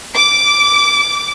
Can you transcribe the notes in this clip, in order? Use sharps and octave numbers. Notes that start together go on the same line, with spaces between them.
D6